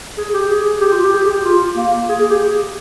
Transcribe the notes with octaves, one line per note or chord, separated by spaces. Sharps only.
G#4
G4
G#4
G4
F4
G4
G#4
G4
F4
A#3
G#4
G#4
G4